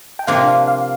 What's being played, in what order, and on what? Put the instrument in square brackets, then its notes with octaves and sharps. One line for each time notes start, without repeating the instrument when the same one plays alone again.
[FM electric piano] G5
[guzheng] C3 F3 A#3 D4 F4 [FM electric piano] F5
[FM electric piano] F5
F5